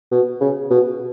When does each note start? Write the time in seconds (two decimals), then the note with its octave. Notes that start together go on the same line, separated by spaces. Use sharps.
0.11 B2
0.41 C#3
0.70 B2